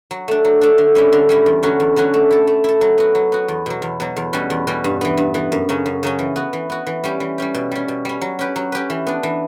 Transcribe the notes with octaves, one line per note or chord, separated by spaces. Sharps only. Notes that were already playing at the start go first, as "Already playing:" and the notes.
F#3
A3 D4
F#3
A3 D4
D3
G3 C#4 E4
D3
G3 C#4 E4
E2
D3 F#3 C#4 F#4
E2
D3 F#3 C#4 F#4
A3
E4 A4
A3
E4 A4
F#3
B3 F#4
F#3
B3 F#4
E2
B2 F#3
E2
B2 F#3
E2
B2 G3 C#4 F#4
E2
B2 G3 C#4 F#4
G2
E3 B3
G2
E3 B3
F#2
C#3 F#3 C#4
F#2
C#3 F#3 C#4
E3
B3 F#4
E3
B3 F#4
E3
G3 C#4 G4
E3
G3 C#4 G4
B2
G3 C#4
B2
G3 C#4
F#3
C#4 G4 B4
F#3
C#4 G4 B4
E3
B3 D4
E3